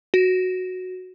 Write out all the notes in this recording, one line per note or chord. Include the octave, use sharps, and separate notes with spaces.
F#4